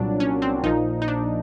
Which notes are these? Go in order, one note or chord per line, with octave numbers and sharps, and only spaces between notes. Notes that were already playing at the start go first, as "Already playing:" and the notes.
Already playing: C2 A#2 F#3 D4
C#4
C4
A#1 A#2 F3 D#4
D#4
D4